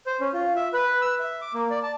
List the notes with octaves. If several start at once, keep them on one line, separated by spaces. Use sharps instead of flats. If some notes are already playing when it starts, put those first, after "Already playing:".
C5
C#4
F4
E5
B4
E6
E5
D6
A#3
D5
A5